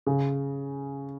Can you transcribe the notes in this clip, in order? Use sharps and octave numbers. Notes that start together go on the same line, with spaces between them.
C#3